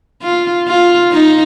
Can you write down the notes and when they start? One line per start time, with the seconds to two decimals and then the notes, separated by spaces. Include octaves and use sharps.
0.22 F4
0.68 F4
1.12 D#4